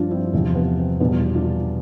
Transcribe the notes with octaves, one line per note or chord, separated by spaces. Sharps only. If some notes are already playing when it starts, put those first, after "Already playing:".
Already playing: G2 F3 D4 F4
C4 E4
E2 C3 F3 C4
B3
C4
E2 B2 G3 B3 D4
D4 F4